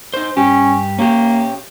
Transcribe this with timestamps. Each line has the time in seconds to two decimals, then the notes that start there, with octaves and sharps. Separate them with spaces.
0.14 D#4 C5
0.37 G2 C#4 G4
0.98 A#3 C#4 G4